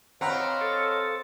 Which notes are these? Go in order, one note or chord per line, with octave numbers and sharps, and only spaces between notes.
C4 B4 C#5 D#5 F5 F#5 A#5
A4